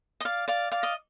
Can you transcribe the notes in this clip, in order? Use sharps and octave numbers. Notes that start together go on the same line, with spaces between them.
D#5
D5 F5
D5 F5
D5 F5
D#5